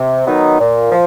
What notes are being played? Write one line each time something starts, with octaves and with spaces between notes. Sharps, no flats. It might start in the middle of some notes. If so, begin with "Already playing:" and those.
Already playing: C3
D#3 F#3 B3 D#4
A#2
F3